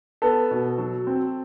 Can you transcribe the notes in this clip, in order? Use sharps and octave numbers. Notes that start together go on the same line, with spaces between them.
B3 A4 A5
B2
F#3
C4